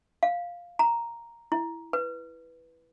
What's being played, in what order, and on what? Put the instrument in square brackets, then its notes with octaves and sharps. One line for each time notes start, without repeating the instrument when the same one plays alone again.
[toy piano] F5
A#5
E4
B4